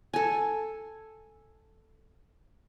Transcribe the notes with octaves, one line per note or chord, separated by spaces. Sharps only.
A4 G#5